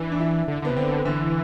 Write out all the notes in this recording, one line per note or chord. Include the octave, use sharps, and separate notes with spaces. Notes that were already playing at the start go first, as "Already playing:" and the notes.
Already playing: E3 D4
D4
E4
D3
D3 B3
C3
D3 C4
D3 E3